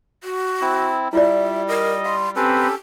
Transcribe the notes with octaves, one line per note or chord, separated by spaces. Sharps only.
F#4
C4 E4
G3 E4 F4 D5 E5
A#4 D#5
F5 C6
C4 C#4 G4 A4 B4